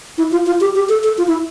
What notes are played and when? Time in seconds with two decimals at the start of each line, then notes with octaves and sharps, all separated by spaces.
0.18 E4
0.32 F4
0.46 F4
0.61 G4
0.75 G4
0.89 A4
1.04 A4
1.18 F4
1.27 E4